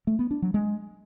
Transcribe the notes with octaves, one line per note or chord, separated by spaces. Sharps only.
A3
B3
D4
F#3
G#3